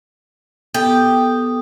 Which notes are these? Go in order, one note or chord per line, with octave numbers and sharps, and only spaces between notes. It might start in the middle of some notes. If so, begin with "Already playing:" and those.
B3 G4 A4 D#6